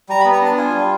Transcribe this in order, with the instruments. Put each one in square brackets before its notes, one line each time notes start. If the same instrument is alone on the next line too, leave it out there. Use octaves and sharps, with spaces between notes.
[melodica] G3 A#5
B5
B3
A#5
D4 A5
F4 G#5
G3